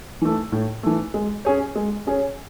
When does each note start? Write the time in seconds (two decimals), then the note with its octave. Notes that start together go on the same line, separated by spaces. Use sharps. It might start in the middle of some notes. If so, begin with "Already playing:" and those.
0.21 E3 A3
0.52 A2
0.83 E3 A3
1.14 G#3
1.45 C#4 G#4 C#5
1.75 G#3
2.07 C#4 G#4 C#5